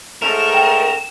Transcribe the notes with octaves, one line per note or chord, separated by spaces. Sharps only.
G#2 A3 C#4 A#4 E7
G5